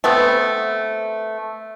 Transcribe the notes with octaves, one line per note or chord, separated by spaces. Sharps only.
A3 B3 C4